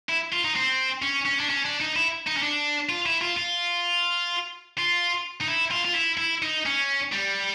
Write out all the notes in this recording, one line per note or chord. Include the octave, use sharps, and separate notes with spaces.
E4
F4
D#4
C4
C#4
C#4
D4
C#4
D4
D#4
E4
D#4
C#4
D4
F4
E4
F4
F4
F4
D#4
E4
F4
F4
E4
E4
D#4
C#4
G3